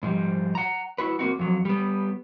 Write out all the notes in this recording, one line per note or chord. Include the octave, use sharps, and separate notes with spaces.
G#2 F3 G3
F#5 A#5
E4 F#4 B4
A#3 C4 D#4 F#4
F2 F#3
G3 B3